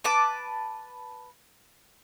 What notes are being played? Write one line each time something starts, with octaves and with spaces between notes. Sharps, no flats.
B4 A5 D6